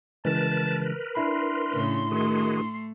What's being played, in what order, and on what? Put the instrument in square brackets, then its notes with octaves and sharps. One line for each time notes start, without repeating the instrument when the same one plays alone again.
[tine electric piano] C#3 E3 G#3 [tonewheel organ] A#4 B4 [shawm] A5
[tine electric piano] D4 E4 B5 [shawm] C6
[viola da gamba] A2 C#3
[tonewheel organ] D#3 F#4 G#4 [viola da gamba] A3